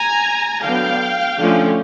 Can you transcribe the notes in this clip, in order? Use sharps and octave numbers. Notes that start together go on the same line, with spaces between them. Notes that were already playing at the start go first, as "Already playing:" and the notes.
Already playing: G#5 A#5
D3 F#3 B3 F5 G5
D3 F3 A3 C#4